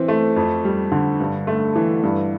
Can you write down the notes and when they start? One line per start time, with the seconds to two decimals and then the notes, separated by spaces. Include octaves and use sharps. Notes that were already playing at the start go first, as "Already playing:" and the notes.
Already playing: E3 C4
0.08 A3
0.36 F2
0.65 G3
0.92 D3
1.20 G2
1.47 A3
1.76 E3
2.03 G2